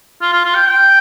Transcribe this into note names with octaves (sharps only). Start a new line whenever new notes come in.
F4
F4
F4
G5
G5